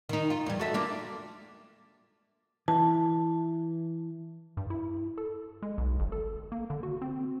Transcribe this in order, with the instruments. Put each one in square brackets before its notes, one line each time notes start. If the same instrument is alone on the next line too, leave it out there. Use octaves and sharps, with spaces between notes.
[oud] D#3 D#4
F4
E2 G3
F#4 A4 E5
A#3 D4 F4
[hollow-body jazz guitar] E3 [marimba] A5
[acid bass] G2
E4
A4
G#3
B1
G1
A4
A#3
D3
F#4
C4